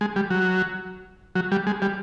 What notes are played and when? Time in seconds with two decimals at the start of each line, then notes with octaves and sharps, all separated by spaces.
0.01 G#3
0.16 G3
0.30 F#3
1.35 F#3
1.52 G3
1.67 G#3
1.82 G3